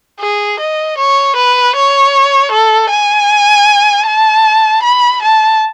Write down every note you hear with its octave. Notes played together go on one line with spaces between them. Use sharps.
G#4
D#5
C#5
B4
C#5
A4
G#5
A5
B5
A5